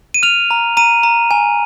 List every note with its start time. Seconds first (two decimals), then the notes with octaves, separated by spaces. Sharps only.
0.14 D#7
0.23 F6 F7
0.51 A#5
0.77 A#5 D#7
1.03 A#5
1.31 G#5